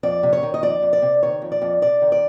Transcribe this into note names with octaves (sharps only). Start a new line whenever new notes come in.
F2 D5
C3
C#5
D#3
D#5
F2 D5
F2
D5
C3
D#3 C#5
F2
D5
F2
C3 D5
D#3
D5